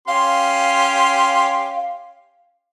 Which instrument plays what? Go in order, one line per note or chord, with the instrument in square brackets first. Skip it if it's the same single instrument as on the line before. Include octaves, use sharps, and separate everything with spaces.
[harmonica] C#4 G4 C6 [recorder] F5